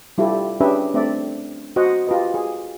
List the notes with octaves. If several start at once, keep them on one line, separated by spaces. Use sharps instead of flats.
G3 E4 F4 G4 A4
C#4 D4 G4 G#4 B4 E5
A3 C4 D4 D5 E5
F#4 C5 D#5 F#5
F4 G4 B4 D#5
G#4